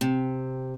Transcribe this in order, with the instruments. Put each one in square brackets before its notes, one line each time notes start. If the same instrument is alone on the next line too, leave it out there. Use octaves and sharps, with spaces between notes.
[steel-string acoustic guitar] C3